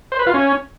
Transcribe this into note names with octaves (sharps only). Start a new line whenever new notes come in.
C5
B4
F4
C#4